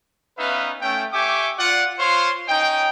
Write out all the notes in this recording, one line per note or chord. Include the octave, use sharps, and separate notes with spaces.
B3 C#4 D#4 B4 E5 F5
A3 C#4 G5
G4 E5 G5 G#5 C#6 D6
F4 D5 F#5
F4 C5 C#5 F5 C6
C#4 D#4 D#5 G5